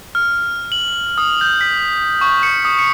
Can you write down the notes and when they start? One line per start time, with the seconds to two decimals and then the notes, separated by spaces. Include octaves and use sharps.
0.15 F6
0.72 F#7
1.18 D#6
1.41 G6
1.61 B6
2.21 C#6
2.43 C#7
2.65 D#6
2.79 C#7